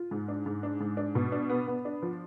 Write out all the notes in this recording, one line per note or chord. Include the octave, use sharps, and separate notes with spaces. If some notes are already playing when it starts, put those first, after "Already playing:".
Already playing: F4
G#2
D4
G#2
D4
G#2
D4
B2
D4
B3
B3
D4
F3